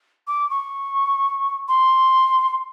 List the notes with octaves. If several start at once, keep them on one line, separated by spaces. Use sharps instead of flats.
D6
C#6
C6